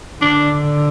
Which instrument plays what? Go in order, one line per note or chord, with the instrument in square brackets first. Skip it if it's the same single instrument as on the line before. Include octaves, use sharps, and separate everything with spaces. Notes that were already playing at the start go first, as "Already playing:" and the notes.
[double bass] D3 [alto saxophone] D4